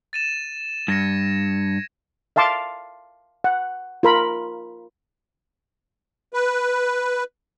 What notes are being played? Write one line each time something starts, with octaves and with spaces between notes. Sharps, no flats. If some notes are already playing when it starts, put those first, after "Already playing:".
A6 D#7 E7
G2 G#6 A#6 C#7
E5 F5 A5 C6 D6
F#5
F4 A#4 B5
B4